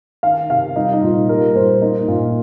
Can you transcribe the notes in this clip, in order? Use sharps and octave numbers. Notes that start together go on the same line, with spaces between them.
D#3 F5
C3 F5
G3 D#4
D#4
A#2 F4
G3 A#4
A#2 C5
A#3 D#4
A#2 F4